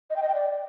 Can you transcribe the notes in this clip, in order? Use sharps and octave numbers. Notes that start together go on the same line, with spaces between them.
D#5
G5
D#5
G5
D5